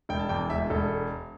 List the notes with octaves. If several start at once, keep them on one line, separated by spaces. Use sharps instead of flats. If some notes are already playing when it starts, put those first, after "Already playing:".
E1 G5
A5
E2 G5
E1 E5
E1 A4